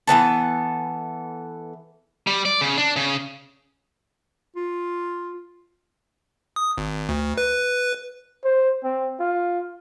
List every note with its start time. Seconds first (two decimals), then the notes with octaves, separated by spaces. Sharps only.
0.07 E3 G#3 B3 A4
2.27 G3
2.45 D5
2.61 C#3
2.77 D4
2.96 C#3
4.56 F4
6.56 D#6
6.78 G#1
7.09 D2
7.38 B4
8.45 C5
8.84 C4
9.20 F4